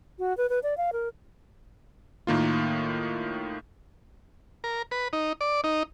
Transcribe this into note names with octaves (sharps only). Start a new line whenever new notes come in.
F#4
B4
B4
D5
F5
A#4
A2 D#3 A#3 F4
A#4
B4
D#4
D5
D#4